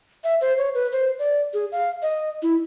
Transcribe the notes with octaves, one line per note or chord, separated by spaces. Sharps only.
E5
C5
C#5
B4
C5
D5
G#4
F5
D#5
E4